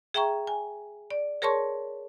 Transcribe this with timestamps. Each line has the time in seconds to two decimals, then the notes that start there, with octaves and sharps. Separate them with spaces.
0.14 G#4 E5 G5 A#5 C#6
0.47 G#5
1.11 D5
1.42 G#4 A#4 C#5 A5 C6 C#6